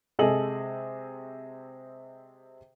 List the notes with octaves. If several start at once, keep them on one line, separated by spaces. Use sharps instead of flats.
C3 G#3 G#4 A4 D#5 F#7